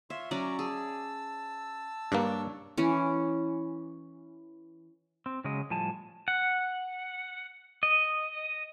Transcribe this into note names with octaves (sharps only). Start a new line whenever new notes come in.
F4 C#5 E5 C6
F#3 C#4 D5 A#5
G#4 A5 E6
G2 A#3 D4 C#5
E3 C#4
C4
C#3 F#3 G#3 D#5
A2 F3 G3 G#5 A5
F#5
D#5